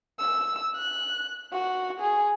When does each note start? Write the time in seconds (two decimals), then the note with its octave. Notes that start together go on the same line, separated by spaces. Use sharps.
0.20 E6
0.76 F#6
1.53 F#4
2.00 G#4